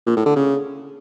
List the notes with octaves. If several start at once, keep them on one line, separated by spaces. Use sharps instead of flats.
A#2
A2
D3
C#3